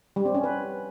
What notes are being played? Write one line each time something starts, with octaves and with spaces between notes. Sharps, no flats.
G3
C4
C#4
B4